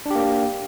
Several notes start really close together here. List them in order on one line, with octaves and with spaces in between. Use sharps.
D4 G4 A#3